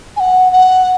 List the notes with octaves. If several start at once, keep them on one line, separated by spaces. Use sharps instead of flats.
G#5
F#5
F#5